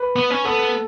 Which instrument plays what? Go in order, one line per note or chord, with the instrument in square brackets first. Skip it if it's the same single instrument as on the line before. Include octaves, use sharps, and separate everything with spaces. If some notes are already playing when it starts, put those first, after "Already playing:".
Already playing: [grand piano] B4
[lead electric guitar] B3
C#4
[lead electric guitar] B3 [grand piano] A4